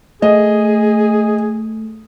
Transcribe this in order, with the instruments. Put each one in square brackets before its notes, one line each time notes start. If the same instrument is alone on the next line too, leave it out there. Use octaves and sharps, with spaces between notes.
[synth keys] A3 [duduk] G#4 [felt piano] D#5